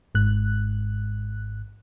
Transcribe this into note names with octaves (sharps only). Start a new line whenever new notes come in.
G#1 G#2 F#6